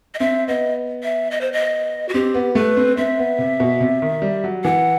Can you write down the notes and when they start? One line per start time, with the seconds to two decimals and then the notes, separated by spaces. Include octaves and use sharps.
0.14 D#5
0.19 C4 E5
0.48 B3 D#5
1.03 E5
1.31 D#5
1.41 C5
1.53 D#5
2.09 F#4
2.14 C4 G4
2.34 B3
2.55 A3 B4
2.77 C4
2.97 C4 E5
3.19 B3
3.38 C3
3.60 B2
3.80 C3
4.02 D#3
4.22 G3
4.44 F#3
4.64 E3 F#5